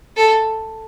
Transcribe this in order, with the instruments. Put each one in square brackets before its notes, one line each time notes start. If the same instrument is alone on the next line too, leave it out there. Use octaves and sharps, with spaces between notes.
[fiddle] A4